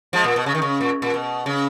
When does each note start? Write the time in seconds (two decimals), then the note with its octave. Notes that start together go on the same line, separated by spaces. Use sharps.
0.13 F3 G#3
0.24 A#2
0.36 B2
0.46 C#3
0.55 D#3
0.62 C#3
0.81 A#2
1.02 A#2
1.14 B2
1.46 C#3